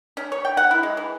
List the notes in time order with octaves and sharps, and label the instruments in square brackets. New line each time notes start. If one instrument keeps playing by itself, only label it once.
[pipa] C#4
C#5
G5
F#5
E4
G#3
E3